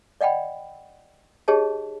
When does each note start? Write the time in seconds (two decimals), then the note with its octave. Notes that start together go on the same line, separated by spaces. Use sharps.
0.21 D5 D#5 F#5 G5 B5
1.48 D#4 G4 G#4 C#5 D#5 A5